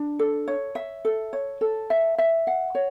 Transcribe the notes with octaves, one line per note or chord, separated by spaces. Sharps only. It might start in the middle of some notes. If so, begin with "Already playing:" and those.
Already playing: D4
A4
C#5
E5
A4
C#5
A4
E5
E5
F#5
C#5